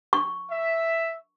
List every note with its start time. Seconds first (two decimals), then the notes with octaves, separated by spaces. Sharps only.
0.13 C#6
0.51 E5